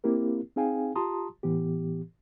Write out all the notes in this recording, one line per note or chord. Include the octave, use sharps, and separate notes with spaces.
A#3 C4 E4 G4 A#4
C4 D#4 G#4 F5 G5 G#5
F4 G4 A5 A#5 C6 D#6
A2 E3 B3 G4